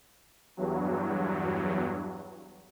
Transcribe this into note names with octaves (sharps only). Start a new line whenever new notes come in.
E2 G2 F#3